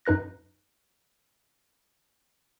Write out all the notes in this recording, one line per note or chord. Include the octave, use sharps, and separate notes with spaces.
F#2 D#4 B4 F#6 A#6